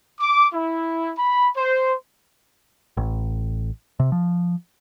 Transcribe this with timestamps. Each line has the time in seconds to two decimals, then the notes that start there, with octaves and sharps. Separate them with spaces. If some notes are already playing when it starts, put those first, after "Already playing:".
0.20 D6
0.54 E4
1.18 B5
1.57 C5
2.97 A1
4.00 C3
4.12 F3